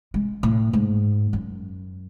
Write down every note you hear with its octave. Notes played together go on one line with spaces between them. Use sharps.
G#3
A2
G#2
F#2